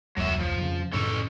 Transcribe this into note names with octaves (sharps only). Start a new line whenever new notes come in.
F1 D2 F#3 E5
F3
F2 C#3
F#2 A2 C#3 C#4 A4